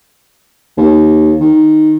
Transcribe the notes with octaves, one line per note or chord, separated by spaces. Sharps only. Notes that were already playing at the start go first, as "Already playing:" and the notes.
D#2
D#3